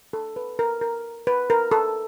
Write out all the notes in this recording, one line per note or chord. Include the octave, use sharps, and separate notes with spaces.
A4
B4
A#4
A#4
B4
A#4
A4